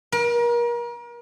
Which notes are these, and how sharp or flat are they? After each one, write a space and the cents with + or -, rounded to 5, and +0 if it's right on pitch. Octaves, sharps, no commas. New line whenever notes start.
A#4 +35